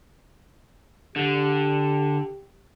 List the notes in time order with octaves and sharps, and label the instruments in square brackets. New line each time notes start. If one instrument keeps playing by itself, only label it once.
[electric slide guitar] D3 [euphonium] G4